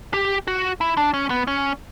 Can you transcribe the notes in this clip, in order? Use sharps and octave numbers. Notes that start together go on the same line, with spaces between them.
G4
F#4
E4
D4
C#4
B3
C#4